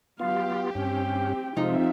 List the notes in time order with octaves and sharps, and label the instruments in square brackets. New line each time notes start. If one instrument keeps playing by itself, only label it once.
[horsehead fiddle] F#3 F5 [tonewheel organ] B3 F4 [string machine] G4
[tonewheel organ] G2 C#4 [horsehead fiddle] C4 G5
[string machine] F2 C4 E5 [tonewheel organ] C3 F3 G#3 [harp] D#4 [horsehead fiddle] F4